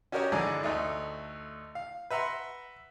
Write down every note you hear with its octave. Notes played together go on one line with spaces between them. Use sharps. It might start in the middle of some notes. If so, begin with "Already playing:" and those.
C#4 F#4 G4 A#4 C#5 D#5
G#2 D3 E3 D5 G#5 A#5
D2 A3 D#4
F5
B4 E5 F#5 A#5 C6